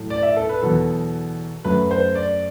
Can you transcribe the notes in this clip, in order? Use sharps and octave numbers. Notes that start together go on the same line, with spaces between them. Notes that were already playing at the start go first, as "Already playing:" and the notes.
Already playing: A2 F#3 A3
D5
E5
A4
B4
E2 B2 F#3 A4
F#2 F#3 A3 B4
C5
D5